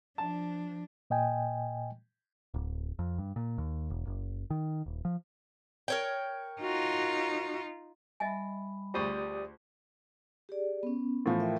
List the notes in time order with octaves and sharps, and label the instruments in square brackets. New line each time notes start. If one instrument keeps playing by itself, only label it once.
[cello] F3 D4 [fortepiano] A5
[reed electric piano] A#2 D#5 G5 G#5
[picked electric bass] D1
F2
G2
A#2
D#2
E1
F#1
D#3
D#1
F3
[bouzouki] A#4 C#5 G5
[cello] D#4 F4 [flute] F#4
[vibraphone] G3 B5 [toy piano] D#5 E5 G#5
[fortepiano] D2 C5 [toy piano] F4 G#4 C#6 [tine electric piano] G4 D5 D#6
[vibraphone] G4 G#4 D5
B3 C#4
[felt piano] A2 E3 F3
[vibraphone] A#4 E5 G5